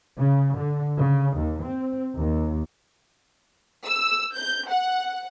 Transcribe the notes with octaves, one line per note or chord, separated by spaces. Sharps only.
C#3
D3
C#3
D#2
C4
D#2
E6
G6
F#5